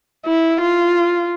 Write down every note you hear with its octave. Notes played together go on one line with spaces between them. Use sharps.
E4
F4